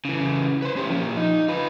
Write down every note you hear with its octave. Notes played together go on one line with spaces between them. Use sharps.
C#3 E3
B4 C5
C#4 G4
F3 A#3
D#4
F4 B4